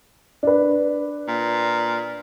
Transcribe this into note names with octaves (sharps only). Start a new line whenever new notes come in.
D4 B4
A#2